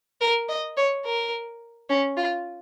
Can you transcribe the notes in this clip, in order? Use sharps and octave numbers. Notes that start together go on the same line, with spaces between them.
A#4
D#5
C#5
A#4
C#4
F4